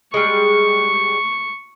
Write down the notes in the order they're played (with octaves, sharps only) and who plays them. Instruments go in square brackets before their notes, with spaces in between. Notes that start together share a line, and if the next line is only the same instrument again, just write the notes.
[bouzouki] G3 G#3 [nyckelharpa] C#6